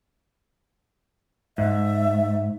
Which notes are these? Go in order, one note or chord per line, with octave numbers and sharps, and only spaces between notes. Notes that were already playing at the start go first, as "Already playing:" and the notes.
G#2 E5